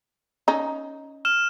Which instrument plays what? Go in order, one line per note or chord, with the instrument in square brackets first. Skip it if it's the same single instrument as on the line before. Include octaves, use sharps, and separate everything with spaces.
[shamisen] C#4 D#4
[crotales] F6 E7